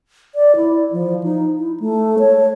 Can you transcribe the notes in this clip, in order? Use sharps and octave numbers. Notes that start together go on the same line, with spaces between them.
D5
E4
F3
D#4
E4
A3
C#5